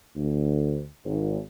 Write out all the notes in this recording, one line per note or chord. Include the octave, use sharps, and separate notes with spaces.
D2
G#1